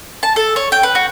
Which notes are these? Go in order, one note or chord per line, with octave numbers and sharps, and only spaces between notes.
A5
A4
C#5
G5
B4
F#4